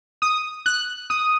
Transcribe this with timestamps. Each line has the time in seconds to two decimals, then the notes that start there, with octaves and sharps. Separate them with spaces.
0.22 D#6
0.66 F#6
1.10 D#6